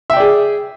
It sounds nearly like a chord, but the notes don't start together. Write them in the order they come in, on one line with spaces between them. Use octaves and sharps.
E5 G5 D5 G#4